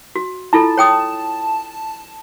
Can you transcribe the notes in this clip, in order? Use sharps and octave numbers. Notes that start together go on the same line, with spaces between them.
F#4
E4 F4 A4 A5
C#5 G5 D#6